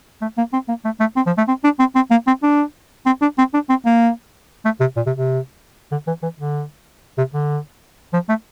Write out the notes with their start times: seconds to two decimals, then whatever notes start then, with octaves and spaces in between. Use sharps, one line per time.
0.21 A3
0.37 A#3
0.53 C4
0.68 A#3
0.85 A3
1.00 A3
1.16 C4
1.26 F3
1.37 A3
1.48 C4
1.64 D4
1.79 C4
1.95 C4
2.11 A#3
2.27 C4
2.43 D4
3.06 C4
3.22 D4
3.38 C4
3.53 D4
3.69 C4
3.86 A#3
4.65 A3
4.80 C3
4.96 A#2
5.06 C3
5.17 C3
5.91 D3
6.07 E3
6.22 E3
6.39 D3
7.18 C3
7.34 D3
8.13 F3
8.29 A3